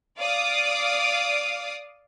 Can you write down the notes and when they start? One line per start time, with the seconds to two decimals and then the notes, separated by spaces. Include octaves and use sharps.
0.18 D5 F5 D6 D#6